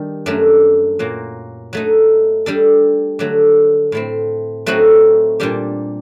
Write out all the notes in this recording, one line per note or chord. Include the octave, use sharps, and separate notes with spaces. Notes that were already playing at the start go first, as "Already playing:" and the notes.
Already playing: D#3 G3 D4
F#2 F#3 A3 D4
A#2 F#3 A#3
F#3 A3 D#4
G3 D4 A4
D3 F#3 A3
A2 A3 C4
F#3 A3 C4 D#4 F#4
A#2 G3 D4 G4